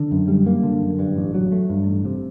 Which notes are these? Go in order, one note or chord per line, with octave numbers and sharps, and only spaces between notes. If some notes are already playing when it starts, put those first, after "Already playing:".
Already playing: D3
F#2
G3
A#3
D3
F#2
G2
A1
F#3
A3
G2
A1
C3